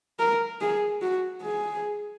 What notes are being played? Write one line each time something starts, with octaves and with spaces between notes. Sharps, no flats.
A#4
G#4
F#4
G#4